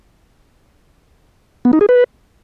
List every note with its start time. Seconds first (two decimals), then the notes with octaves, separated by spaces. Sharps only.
1.65 B3
1.73 D#4
1.81 G#4
1.89 B4